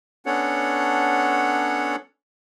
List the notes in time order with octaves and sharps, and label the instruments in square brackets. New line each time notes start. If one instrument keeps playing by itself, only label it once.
[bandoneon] B3 C#4 D4 A4 C#5 F#5